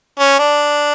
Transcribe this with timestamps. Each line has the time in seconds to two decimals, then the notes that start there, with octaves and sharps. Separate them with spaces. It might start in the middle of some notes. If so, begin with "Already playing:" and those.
0.19 C#4
0.40 D4